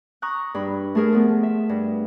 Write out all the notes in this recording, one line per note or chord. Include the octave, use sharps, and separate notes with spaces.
A#5 C#6 D#6 F#6
G2 B5
A3 G#4 A#4
F3 B3
E5
G2